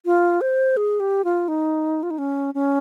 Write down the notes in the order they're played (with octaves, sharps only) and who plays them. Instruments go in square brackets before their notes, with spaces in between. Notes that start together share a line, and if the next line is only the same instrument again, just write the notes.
[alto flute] F4
C5
G#4
G4
F4
D#4
F4
D#4
C#4
C#4